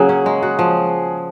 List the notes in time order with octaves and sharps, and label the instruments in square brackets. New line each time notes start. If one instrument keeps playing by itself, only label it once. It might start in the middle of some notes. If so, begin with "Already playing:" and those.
Already playing: [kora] C#3 F#3 A#3 [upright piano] G#4
[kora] C#4
G#3
F#4
F3